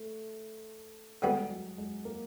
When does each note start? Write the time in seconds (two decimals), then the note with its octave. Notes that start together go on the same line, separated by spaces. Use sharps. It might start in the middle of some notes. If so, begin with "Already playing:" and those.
Already playing: A3
1.22 D3 G3 G#3 B3 D#4 F#4
1.49 F#3
1.78 G#3
2.05 A#3